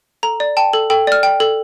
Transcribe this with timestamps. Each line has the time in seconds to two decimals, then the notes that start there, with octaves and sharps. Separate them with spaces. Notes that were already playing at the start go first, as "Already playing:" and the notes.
0.23 A4 A#5
0.40 D5
0.57 G5 A5
0.73 A4
0.90 A4 G5
1.07 D5 F6
1.23 G5
1.40 A4